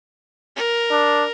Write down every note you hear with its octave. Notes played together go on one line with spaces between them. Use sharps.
A#4
D4